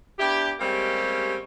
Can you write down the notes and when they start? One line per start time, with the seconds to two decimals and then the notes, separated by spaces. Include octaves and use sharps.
0.19 B3 D4 E4 G4
0.60 G3 G#3 A#3 C4 C#4 G4